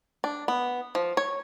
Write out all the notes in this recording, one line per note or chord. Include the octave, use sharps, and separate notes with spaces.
D4
B3
F3
C#5